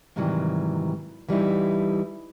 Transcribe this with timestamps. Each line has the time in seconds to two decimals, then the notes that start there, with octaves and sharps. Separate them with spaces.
0.16 G#2 C3 D#3 E3 F#3 G3
1.29 E3 G3 D#4 E4